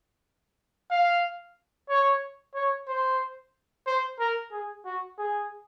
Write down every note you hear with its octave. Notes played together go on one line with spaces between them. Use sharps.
F5
C#5
C#5
C5
C5
A#4
G#4
F#4
G#4